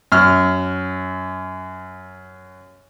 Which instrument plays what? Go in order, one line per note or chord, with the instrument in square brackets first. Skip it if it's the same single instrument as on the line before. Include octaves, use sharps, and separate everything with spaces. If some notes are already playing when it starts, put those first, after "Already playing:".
[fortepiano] F#2 F6